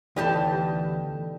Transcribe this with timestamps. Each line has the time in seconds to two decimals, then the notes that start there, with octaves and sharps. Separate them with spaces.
0.16 D2 B2 E3 D#4 G4 A4 D5 A5